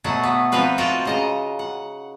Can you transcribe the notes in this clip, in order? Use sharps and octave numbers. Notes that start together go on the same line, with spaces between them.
B2 F#3 A3 F#5
B3
F3 C4 D#4 B4 F5
F4 F#4 A4 D#5 F5 G5
C#3 D#5 A#5
F#5